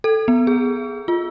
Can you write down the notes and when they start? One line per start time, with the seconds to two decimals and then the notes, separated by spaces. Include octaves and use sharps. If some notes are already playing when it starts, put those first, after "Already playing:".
0.04 A4
0.28 B3
0.47 G#4
1.08 F4